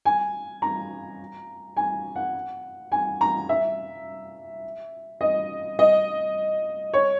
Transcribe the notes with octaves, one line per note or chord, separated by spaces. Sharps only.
G#5
A#5
G#5
F#5
G#5
A#5
E5
D#5
D#5
C#5